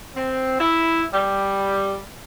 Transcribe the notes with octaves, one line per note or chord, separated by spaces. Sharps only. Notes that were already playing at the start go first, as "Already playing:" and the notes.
C4
E4
G3